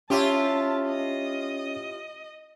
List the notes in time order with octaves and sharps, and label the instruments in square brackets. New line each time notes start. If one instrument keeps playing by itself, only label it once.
[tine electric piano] C#4 C#5 [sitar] E4 F4 G4 [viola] A5
[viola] D#5